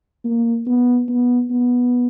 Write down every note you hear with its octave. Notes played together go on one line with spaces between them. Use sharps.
A#3
B3
B3
B3